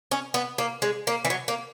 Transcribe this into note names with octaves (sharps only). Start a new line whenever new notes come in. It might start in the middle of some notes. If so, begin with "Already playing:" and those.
C#4
B3
A#3
G#3
A#3
E3
F#3
A#3